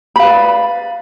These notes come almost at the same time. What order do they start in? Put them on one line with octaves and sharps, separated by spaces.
B5 F5 B4 D5